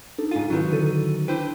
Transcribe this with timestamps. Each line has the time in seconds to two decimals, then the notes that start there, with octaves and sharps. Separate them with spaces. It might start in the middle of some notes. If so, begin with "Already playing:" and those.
0.18 D4 D#4 A4
0.31 G#2 F4 D#7
0.50 D#3 F#3 C#4 E4 B4
0.73 D3 A4 D#7
1.28 D4 E4 B4 C5 G5